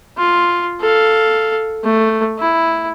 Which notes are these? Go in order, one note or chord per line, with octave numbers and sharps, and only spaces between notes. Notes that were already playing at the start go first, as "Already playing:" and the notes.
F4
A4 F5
A3
E4